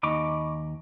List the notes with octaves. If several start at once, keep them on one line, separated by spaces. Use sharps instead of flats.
D#2 D#4 B5 C#6 D6